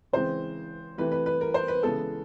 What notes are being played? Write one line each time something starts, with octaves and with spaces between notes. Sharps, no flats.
C#3 E3 G#3 C4 C5
C3 E3 A3 B4
B4
B4
A#4
C5
B4
C#3 E3 G#3 B3 A4